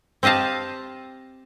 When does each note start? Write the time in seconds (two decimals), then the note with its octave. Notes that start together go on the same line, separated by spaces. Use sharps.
0.23 C4 G4 D#5 F5 A5